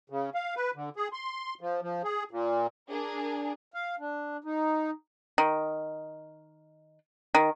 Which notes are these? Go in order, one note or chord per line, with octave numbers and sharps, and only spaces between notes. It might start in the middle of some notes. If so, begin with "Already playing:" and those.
C#3
F5
B4
D3
G#4
C6
F3
F3
G#4
A#2
D4 G#4 A#4
F5
D4
D#4
D#3
D#3